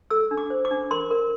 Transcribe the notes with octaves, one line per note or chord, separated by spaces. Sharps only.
A4 E6
D4
D6
C5
D6
D4
A#4 C6
A#4